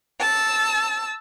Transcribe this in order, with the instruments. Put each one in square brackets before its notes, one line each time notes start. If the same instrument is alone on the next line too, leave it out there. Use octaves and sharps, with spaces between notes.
[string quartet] A5 E6